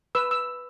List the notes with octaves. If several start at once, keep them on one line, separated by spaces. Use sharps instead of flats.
B4 E6
E6